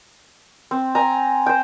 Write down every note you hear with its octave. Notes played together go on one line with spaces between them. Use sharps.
C4
G5 G#5 A#5
C5 G5